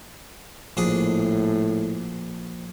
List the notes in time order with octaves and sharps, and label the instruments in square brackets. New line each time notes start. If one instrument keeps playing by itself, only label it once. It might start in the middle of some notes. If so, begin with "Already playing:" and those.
[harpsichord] A#1 D4 G#4 [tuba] A2